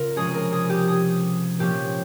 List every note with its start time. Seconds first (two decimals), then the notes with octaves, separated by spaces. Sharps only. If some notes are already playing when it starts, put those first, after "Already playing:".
Already playing: C#3 F4 A#4
0.16 C3 F3 G#3 C#4 G#4
0.34 A#4
0.52 G#4
0.70 G4
0.88 G#4
1.59 A#2 F3 A#3 C#4 G4